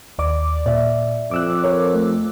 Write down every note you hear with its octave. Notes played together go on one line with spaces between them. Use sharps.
D#2 D5 D6
A#2 D5 E5
F2 D6 E6 F#6
A#4 C#5
A3